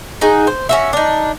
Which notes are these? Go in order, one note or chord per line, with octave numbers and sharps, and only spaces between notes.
D#4 F#4 G#4
C5
C#4 F#4 E5
D4 D#4